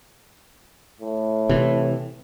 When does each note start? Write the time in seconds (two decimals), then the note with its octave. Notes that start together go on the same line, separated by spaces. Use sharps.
1.01 A2
1.49 C3 E3